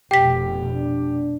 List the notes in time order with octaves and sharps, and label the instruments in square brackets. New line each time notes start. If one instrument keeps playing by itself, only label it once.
[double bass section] F1 B2 [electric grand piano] G4 [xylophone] G5 B6
[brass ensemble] D4